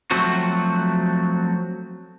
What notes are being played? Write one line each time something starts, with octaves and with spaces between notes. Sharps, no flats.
F3 F#3 A3 C4 F#4